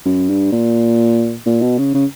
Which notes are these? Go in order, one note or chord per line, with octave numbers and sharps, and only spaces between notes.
F#2
G2
A#2
A#2
B2
C#3
C#3